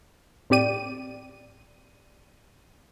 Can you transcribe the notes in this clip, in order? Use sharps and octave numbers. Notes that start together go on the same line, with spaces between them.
A2 C4 G4 D5 D#7